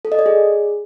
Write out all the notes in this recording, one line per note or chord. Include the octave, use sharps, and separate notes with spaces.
A4
D#5
D5
G#4